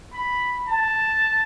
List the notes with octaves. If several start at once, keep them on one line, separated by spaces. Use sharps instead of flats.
B5
A5